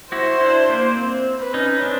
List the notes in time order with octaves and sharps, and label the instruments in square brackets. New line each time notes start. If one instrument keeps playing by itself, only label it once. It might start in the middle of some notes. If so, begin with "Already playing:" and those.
[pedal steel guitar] E4 F#4 [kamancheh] C5
[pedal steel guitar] D4 E4
A#3
C4
[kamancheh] B4
[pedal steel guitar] C#4 D#4
C4 D4